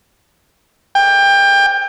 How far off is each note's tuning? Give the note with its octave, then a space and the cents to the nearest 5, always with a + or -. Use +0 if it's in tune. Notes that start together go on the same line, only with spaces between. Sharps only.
G5 +25